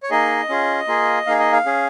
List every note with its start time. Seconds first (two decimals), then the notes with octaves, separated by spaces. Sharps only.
0.03 C#5
0.10 A#3 D#4 G#4 D#5
0.49 C#4 F4 G#4
0.88 A#3 F4 G#4
1.26 A#3 D#4 G#4 F5
1.39 D#5
1.52 F5
1.66 C#4 G#4